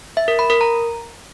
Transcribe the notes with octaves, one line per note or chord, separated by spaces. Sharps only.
E5
A#4
B5
A#4
A#5